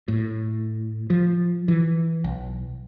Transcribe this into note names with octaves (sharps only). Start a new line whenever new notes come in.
A2
F3
E3
B1